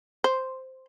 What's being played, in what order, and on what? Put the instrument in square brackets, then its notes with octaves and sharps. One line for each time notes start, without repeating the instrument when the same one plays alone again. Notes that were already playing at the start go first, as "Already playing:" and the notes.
[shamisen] C5